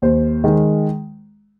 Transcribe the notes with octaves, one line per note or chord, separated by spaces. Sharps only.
D#2 C5
D#3 G#3